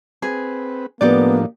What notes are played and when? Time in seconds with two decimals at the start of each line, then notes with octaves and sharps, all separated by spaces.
0.22 C4 G#4 B4
1.01 A2 F3 A#3 B3 D4 D#4 G4 D5